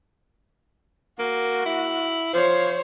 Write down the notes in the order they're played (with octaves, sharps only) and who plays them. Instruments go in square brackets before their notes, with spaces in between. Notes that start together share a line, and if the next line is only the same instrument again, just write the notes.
[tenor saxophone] A#3 [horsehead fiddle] F#4
[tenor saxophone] E4
[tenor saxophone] F3 [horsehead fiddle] C5 C#5